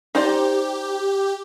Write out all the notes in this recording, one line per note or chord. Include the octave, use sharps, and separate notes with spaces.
D#4 G4 C5 D5